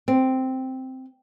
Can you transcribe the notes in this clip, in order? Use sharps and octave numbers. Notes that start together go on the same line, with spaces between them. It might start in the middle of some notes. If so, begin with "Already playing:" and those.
C4